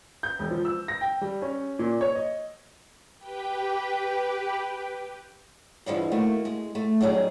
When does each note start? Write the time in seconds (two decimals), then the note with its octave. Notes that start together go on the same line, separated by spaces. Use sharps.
0.23 G6
0.39 E1
0.50 F3
0.65 E6
0.88 A#6
1.01 G5
1.21 G3
1.42 C#4
1.79 A#2
2.01 C#5
2.15 D#5
3.18 G4 B4 G5
5.86 G2 D3 E3 F3 G3 G#3
6.12 D#3 A3 A#3 F#4
6.45 G#3
6.75 A3
7.00 F#3 G3 C#4 D#4 G#4